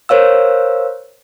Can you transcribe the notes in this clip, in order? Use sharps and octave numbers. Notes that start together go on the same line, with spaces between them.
A#4 C5 C#5 F5 E6